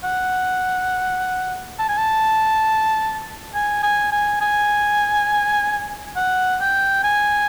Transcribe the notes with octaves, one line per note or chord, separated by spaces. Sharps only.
F#5
A5
G#5
A5
G#5
G#5
G#5
G#5
F#5
G5
G#5